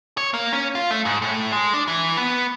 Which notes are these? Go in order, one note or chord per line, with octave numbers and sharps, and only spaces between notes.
C#5
A#3
C#4
F4
A3
G#2
A2
G#3
D4
E3
B3